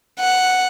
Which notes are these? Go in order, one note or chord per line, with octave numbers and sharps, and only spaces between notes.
F#5